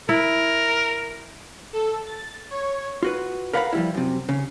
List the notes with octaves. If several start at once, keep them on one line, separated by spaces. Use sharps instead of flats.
E4 A#4
A4
A6
C#5
F4 F#4 B4
A#4 B4 F5 F#5 G#5 B5
F3 G3 E4
F#2 C3
C#3